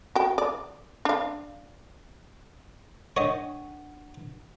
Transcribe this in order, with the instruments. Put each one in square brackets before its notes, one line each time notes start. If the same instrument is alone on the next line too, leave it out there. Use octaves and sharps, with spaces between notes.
[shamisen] F#4 G5
D5
D4 F5
[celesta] D4 F#5 [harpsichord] C#5 D#5